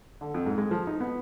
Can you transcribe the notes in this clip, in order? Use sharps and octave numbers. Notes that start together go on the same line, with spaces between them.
D3
F2
G#2
G#3
F3
D#4
B3